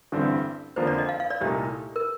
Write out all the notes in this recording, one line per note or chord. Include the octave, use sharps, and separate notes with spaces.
A1 G2 D3 G3 C4
F2 D3 F3 A#3 D4 C5
D5
D#5
F5
F5
D5
C2 A#2 A3 D#4 G4
A#4